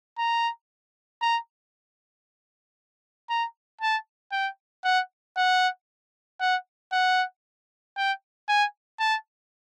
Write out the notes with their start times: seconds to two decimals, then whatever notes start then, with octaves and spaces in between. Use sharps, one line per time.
0.18 A#5
1.22 A#5
3.30 A#5
3.81 A5
4.32 G5
4.84 F#5
5.37 F#5
6.40 F#5
6.92 F#5
7.97 G5
8.49 G#5
9.00 A5